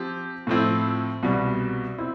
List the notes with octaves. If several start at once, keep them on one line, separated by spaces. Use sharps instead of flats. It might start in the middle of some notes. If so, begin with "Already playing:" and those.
Already playing: F3 C4 G4
A2 F3 C4 E4
C2 B2 G3
C4 E4